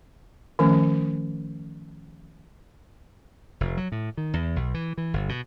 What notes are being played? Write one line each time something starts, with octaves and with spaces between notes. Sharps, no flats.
D#3 F3 A3 C#4
F1
F#3
A2
D#3
E2
B1
E3
E3
G1
B2